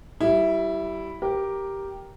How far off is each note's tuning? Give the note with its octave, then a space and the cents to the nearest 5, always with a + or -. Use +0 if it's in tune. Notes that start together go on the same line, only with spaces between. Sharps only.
G3 -20 E4 +0
G4 +0 A#4 +5